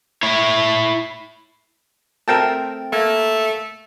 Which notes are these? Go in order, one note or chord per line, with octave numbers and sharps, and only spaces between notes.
E4 C#5
A3 C4 A#4 E5 G5 A5
A3 A#3